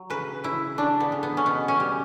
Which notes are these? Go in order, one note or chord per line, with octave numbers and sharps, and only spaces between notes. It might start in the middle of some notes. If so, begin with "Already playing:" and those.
Already playing: F#3
C#3 B4
C#3 E4
C#3 D4
B3
C#3
B3
C#4
B2 B3
C#4
G3